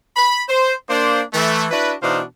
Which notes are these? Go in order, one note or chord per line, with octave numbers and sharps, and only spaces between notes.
B5
C5
A#3 D4 C5
E3 A3
D4 E4 F#4 B4
B2 E3 D4 D#4 C5 F5